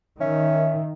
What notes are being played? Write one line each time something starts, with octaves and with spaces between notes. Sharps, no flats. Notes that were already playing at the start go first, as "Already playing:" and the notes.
D#3 C#4 E5